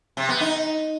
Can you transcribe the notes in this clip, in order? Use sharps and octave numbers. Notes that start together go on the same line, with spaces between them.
C3
B3
D#4